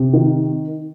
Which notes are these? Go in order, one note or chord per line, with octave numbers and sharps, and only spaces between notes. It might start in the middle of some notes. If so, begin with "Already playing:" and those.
Already playing: C3
D#3